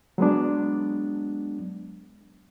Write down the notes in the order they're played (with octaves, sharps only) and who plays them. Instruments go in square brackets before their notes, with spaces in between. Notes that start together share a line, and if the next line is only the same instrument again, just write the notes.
[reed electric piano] F#3 G#3 B3 D4